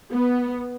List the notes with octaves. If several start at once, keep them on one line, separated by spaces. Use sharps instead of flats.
B3